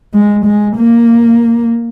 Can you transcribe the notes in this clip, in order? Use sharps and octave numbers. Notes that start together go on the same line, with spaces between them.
G#3
G#3
A#3